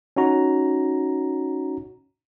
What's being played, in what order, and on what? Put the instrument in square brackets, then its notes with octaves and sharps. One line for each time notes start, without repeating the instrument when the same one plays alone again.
[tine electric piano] C#4 D#4 F#4 A#5